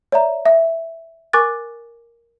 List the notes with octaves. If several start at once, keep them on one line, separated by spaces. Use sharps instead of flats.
C#5 D5 E5 A#5
E5
A#4 G#5 C#6 D6 F#6 A6